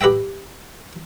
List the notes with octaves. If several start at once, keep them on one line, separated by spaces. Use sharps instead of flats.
G4 B4 D#5 E5 G5